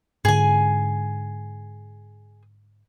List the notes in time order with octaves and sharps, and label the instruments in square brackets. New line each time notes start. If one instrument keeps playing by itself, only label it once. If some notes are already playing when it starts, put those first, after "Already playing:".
[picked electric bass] G#2 D3 [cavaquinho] G#4 G#5